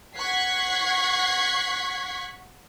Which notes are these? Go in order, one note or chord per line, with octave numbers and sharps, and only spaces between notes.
F#5 C#6 F#6 G#6 B6 C7